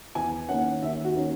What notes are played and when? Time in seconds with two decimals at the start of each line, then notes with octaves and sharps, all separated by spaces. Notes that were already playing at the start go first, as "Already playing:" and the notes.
0.15 E2 G#5
0.49 D#3 A#3 C#4 F#5
0.82 D#2 E5
1.04 F#4
1.15 D#3 A#3 C#4